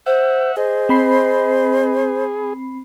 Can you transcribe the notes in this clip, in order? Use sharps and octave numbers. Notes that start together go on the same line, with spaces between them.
C5 E5 F#5
G#4 C5 D#5
C4 B5 C7